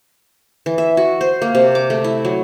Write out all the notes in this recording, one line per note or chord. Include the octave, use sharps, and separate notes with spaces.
E3
E5
F#4
C5
A#3
C3
D6
A3
E4
F#3